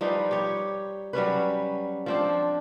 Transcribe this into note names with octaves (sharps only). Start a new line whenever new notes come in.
F3 G3 D#4 B4
G4 C#5
F#3 G3 C#4 B4
F3 C4 D4